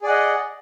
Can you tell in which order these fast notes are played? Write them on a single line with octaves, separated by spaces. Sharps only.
G#4 D5 F#5 D#5